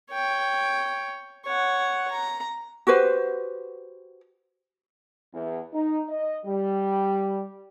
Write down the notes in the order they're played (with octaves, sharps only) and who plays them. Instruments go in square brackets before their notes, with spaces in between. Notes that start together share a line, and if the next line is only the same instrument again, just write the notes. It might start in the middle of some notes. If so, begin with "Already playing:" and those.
[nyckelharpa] C#5 G5
C#5 F#5
A#5
[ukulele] F#4 G4 B4 C5
[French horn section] E2
D#4
D#5
G3